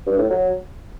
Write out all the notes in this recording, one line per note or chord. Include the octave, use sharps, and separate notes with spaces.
G2
A2
F#3